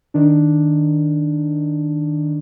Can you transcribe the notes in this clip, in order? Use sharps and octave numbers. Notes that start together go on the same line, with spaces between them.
D#3 D4